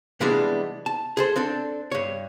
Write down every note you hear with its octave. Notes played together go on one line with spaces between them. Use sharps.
C3 E3 G3 G#3 B3 D4
A5
G#4 A4 C5
C4 D4 A4
G2 C#5